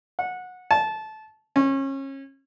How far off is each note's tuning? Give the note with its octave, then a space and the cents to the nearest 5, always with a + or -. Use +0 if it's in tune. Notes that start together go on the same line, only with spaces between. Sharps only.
F#5 -20
A5 -20
C#4 -30